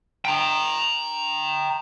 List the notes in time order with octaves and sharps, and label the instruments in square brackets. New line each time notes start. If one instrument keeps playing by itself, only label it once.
[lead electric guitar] G5 A#5